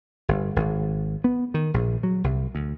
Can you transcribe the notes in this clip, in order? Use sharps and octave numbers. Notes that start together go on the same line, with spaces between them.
G1
G#1
B3
D#3
A#1
F#3
C2
D2